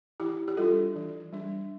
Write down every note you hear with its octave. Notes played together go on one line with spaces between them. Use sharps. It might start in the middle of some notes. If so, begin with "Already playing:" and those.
E3 E4 G4
G4
G3 D4 F4 A4
E3
G3 D4